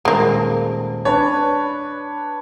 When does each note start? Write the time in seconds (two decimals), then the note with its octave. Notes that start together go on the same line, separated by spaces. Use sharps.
0.05 D#1 G#3 A#3
1.05 D4 B4 C#5 A5